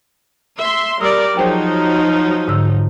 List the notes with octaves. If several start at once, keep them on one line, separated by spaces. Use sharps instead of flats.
E5 C6
G3 A#4 D5 C6 D#6 E6
F3 F#3 D#4 G#4 C5 G5
G#2 D3 E6